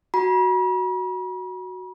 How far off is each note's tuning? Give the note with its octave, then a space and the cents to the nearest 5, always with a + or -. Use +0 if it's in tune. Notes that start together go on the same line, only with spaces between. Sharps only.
F#4 +0 B5 -45